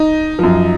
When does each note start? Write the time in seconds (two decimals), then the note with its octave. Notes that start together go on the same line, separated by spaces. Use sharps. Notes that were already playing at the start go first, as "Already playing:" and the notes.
Already playing: D#4
0.39 F#2 F3